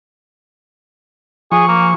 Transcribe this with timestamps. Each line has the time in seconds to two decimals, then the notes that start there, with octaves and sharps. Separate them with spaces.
1.52 F3 G#4 C#6
1.68 A#3